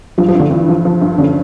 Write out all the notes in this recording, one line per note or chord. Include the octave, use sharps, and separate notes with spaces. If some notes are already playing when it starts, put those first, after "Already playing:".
G2 F3
F3
G2 D3
G2 E3
F3
F3
G2
D3 C#4